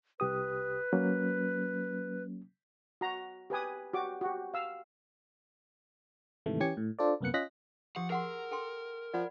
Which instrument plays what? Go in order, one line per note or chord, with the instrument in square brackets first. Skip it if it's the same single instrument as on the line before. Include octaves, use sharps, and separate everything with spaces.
[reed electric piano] C2 G4 D#6 [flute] B4
[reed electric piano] F#3 A#3 C#4
[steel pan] F#4 A#5
G4 B4 G#5 D#6
F#4 G4 D6
F#4 G4
F5 E6
[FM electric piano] G#2 C3 D#3 E3 A3
E3 C#4 G4 G#6 C#7
A2
D4 F4 A4 C5 D5
C2 F#2 A#3 B3 F#6 C#7
C#4 F4 D#5 F#6 A#6 B6
[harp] F3 [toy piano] G4 D6 D#6 [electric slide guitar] F#5
[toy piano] G#4 F#5 C6 [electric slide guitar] A#4 [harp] E6 C7
[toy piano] A4 G5 C6
[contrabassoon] F3 [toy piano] D5 F#5 B5